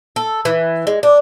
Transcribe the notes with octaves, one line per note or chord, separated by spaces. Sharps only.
A4
E3
G#3
D4